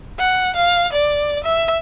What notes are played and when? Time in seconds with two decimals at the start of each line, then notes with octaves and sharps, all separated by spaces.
0.19 F#5
0.56 F5
0.92 D5
1.44 E5